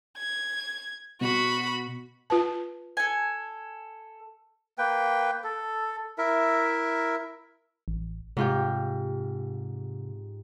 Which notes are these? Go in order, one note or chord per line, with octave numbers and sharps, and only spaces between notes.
G#6
B2 F#4 B5
F4 B4 A5
A4 G#5
A#3 B4 G5
A4
E4 A#4 E5
A1
G#2 C3 F4 G4